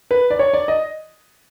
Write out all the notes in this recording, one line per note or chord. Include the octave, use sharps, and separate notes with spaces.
B4
D5
C#5
D5
D#5